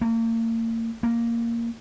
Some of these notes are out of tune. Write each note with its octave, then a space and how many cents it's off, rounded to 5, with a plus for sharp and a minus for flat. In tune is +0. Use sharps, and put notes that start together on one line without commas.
A#3 -40
A#3 -5